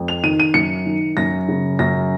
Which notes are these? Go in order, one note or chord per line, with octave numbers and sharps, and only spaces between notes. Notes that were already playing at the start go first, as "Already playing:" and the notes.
Already playing: F2
F7
D#3 D#7
D#7
F#2 C#7
D#3
F#2 A#6
C#3
F#2 A#6